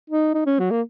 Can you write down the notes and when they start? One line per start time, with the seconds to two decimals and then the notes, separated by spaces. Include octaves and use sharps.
0.10 D#4
0.34 D#4
0.46 C#4
0.59 F#3
0.71 A#3